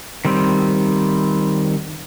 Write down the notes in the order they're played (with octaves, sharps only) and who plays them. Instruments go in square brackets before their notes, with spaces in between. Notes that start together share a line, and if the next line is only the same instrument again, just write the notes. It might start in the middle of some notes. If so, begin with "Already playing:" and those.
[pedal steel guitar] D#3 G3 C4